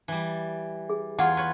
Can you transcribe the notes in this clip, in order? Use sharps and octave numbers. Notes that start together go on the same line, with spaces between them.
E3 G3
G#4
E2 F4 C#5 F#5 G5 D6
B4 C#5